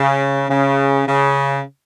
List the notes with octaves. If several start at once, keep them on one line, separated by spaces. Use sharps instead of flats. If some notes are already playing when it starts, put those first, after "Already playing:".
Already playing: C#3
C#3
C#3